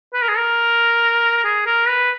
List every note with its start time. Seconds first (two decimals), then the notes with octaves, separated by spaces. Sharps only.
0.13 B4
0.22 A#4
0.28 G#4
0.37 A#4
1.44 G#4
1.66 A#4
1.88 B4